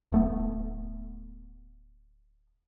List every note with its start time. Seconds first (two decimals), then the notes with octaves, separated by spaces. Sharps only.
0.12 D1 A3 B3